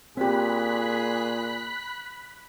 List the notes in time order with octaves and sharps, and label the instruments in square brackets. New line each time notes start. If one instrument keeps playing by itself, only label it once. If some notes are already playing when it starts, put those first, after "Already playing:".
[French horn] A#2 [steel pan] C4 G4 [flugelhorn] G#4 [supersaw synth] B5 F#6 B6